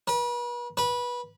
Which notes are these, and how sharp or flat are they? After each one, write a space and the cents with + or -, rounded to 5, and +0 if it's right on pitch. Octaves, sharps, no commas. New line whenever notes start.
B4 -40
B4 -20